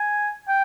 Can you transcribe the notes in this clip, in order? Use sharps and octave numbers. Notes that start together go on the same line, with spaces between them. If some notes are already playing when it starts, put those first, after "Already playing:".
Already playing: G#5
G5